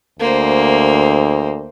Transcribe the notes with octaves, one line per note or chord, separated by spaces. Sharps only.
D2 A#3 C5